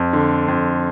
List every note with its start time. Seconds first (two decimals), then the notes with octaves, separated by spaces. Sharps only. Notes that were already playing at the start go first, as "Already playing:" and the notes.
Already playing: F2
0.13 D3
0.48 F2